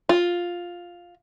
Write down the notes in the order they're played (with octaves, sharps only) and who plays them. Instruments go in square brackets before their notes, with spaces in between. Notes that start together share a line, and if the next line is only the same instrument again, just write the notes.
[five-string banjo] F4